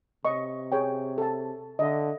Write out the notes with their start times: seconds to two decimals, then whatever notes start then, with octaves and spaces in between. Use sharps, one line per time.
0.25 C3 C#5 D#5 C#6
0.72 G#4 C#5 G5
1.18 A4 A5
1.79 D3 D#5 E5